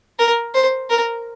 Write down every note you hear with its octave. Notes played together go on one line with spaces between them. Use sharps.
A#4
C5
A#4